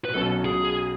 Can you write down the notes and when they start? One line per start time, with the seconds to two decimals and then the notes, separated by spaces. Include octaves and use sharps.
0.05 B4
0.14 B1 B2 F#3 C#4 A4
0.45 G#4